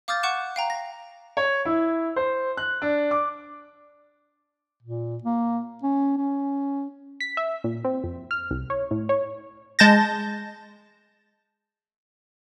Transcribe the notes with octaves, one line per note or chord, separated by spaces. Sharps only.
F5 D6 D#6 F6 G6 A6
F#5 C#6 D6 F#6 E7
F5 G5 A#5
A#6
C#5
E4
C5
F#6
D4
D6
A#2
A#3
C#4
C#4
B6
E5
A#2
C4
F2
F6
C2
C#5
A2
C#5
G#3 A5 G6 A6 A#6